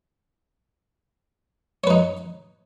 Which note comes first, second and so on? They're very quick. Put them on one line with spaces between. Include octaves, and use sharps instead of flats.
C#5 B4 D#4